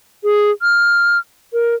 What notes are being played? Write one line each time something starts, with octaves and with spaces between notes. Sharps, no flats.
G#4
F6
A#4